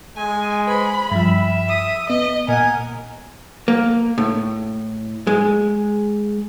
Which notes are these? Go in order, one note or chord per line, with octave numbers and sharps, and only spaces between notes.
G#3 G#5
B4 C5 B5
G2 F3 E5
D#6
B3 D#5
A#2 A#4 D#5 F#5 G#5
A#3
A2
G#3